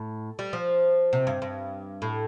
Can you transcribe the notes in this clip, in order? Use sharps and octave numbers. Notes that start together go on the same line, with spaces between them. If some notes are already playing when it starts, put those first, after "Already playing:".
Already playing: A2
G3
F3
C3
G2
G2
A2